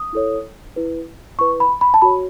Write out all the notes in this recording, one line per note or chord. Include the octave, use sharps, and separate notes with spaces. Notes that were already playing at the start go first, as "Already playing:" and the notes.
Already playing: D#6
E4 A4 C#5
E4 B4
E4 B4 C#6
B5
B5
A5
F#4 C#5 B5